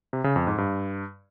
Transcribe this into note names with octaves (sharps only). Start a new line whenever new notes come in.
C3
C#3
F2
G#2
G2